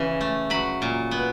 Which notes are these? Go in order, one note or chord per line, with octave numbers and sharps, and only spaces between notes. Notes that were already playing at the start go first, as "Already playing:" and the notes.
Already playing: C#3 E3
A3
F#3 B5
A#2
B3